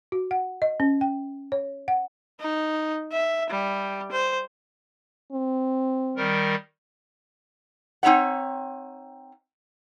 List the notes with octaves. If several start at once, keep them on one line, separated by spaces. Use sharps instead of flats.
F#4
F#5
D#5
C#4
G5
C#5
F#5
D#4
E5
G3
C5
C4
D#3 G3 A#4
C4 D#4 C#5 E5 F#5